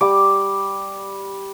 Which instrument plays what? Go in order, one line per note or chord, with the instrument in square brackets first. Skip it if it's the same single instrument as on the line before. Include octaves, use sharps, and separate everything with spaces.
[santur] G3 D6